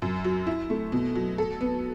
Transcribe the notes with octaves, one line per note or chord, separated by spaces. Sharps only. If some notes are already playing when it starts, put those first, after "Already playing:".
F#2
F#3
E4
A3
B2
F#3
A4
B3